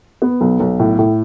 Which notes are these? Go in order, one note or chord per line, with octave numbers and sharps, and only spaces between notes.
B3
B1
B1
A2
A2